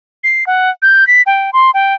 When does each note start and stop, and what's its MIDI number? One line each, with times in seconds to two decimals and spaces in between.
0.24 0.44 96
0.47 0.70 78
0.82 1.07 91
1.07 1.22 95
1.26 1.50 79
1.53 1.71 84
1.74 1.94 79